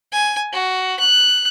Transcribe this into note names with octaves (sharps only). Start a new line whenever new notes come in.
G#5
F#4
F#6